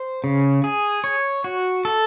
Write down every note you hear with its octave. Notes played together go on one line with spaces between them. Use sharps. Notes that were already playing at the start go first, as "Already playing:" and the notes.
Already playing: C5
C#3
G#4
C#5
F#4
A4